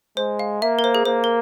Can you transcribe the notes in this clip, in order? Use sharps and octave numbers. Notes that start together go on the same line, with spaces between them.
G#3 C5
F5
A#3 E5
A#4
C5
G#4
A#3 C5
A#4